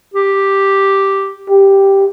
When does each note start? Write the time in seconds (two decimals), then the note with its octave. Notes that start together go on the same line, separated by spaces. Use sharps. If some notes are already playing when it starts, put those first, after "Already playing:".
0.14 G4
1.50 G4